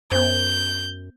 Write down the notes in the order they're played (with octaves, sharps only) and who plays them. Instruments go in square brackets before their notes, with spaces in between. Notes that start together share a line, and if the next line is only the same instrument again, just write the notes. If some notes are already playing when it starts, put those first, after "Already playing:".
[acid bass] F#2 [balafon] B3 C5 [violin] G6